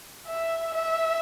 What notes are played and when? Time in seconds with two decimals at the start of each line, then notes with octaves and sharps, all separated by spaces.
0.26 E5
0.74 E5